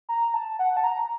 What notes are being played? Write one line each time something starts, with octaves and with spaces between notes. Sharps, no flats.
A#5
A5
F#5
A5
A#5